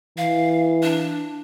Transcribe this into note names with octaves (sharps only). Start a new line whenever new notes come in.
E3 F5
D4